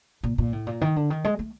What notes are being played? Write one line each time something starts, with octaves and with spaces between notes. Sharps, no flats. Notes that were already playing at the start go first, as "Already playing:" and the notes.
A#2
A#2
A2
A#2
D#3
D3
D#3
G#3
A3